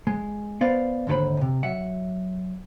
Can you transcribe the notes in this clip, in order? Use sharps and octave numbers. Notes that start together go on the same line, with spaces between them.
G#3
B3 C5 D5 F5
D#2 G#2 D3 F4 C5 B5
D2 C3
F#3 E5 F#5